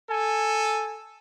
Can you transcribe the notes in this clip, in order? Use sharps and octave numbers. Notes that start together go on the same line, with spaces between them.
A4 G#5